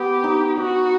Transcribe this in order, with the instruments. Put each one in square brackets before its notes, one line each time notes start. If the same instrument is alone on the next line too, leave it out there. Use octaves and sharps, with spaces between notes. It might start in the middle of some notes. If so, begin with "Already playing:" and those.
Already playing: [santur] B3 [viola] G4
[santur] D#4
[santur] D#4 [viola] F#4